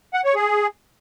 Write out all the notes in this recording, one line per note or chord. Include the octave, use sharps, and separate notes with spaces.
F#5
C#5
G#4